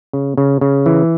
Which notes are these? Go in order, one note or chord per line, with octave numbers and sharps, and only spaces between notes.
C#3
C#3
C#3
E3